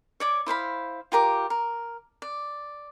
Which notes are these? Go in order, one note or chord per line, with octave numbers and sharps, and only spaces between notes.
C#5 D5 D6
E4 C5 F5 B5
F4 G4 A#4 D6
A#4
D5